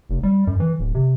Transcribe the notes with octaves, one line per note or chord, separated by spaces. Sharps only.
F1
G3
F#2
E3
D1
C3